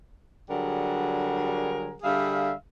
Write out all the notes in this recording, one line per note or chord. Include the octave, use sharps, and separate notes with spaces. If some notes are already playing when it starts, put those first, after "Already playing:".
D3 F#3 G3 G#4 A#4 F#5
D3 G3 G#4 E5 F5